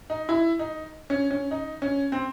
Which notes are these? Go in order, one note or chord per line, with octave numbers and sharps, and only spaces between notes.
D#4
E4
D#4
C#4
C#4
D#4
C#4
C4